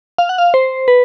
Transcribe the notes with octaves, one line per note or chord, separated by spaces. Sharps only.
F5
F#5
F5
C5
B4